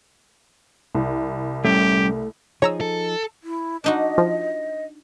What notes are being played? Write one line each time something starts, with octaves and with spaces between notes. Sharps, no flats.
C2
G3 A3 C#4 G4 C#5
F3 D#4 G#4 C#5 A#5 E6
A4
E4
D4 D#4 F#4 D#5
F3